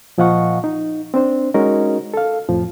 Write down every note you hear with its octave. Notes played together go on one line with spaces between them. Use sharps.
A#2 F3 D#5 F5 F#5 C#6
D#4
C4 D4 C5
G#3 C#4 D#4 F#4 A#4 D#5
A4 F5
F2 A2 F3